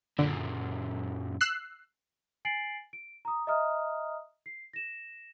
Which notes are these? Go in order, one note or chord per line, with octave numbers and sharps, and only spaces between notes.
F#2 A#2 D3
E6 F#6 C7
G#5 A6 C7 D7 F#7
D7
A#5 D#6
D#5 E5 A#5 D#6 F6
C7
A#6 E7